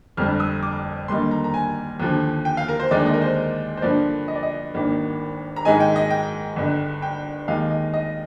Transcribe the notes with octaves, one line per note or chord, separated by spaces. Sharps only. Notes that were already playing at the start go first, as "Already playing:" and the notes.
G1 F2 D3 G3 F6
D#6
D6
D#2 D3 G3 A#3 D#4 C6
A#5
A#5
G#5
D#2 D3 F3
G5
F5
A#4
C5
D#2 D3 G#3 D#4 D5
D#5
A#4
C5
C5
G2 D3 F3 A#3 D5
D#5
D5
D#5
G#1 G2 D#3 A#3
A#5
G#2 D#3 G#3 D#4 G#5
G5
D#5
G5
G1 G2 D3
G5
D#2 D#3 G#3 D#4 F5
D#5
D#5